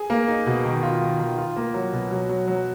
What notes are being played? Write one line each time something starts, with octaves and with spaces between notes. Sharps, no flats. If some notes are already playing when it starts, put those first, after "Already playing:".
Already playing: G#4
A#3
D#4
B2
D#3
F4
D#3
D#3
F4
A#3
F#3
B2
F#3
F#3
F#3